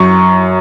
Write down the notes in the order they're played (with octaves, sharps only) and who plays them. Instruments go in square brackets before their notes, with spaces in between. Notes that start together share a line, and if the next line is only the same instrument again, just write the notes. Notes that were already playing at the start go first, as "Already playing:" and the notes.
Already playing: [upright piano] F#2 C#6